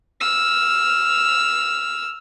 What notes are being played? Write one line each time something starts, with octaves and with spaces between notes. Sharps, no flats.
E6 F6